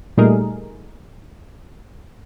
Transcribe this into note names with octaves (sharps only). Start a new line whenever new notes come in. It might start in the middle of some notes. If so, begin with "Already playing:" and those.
A#2 G3 A3 D#4 G#4 A#4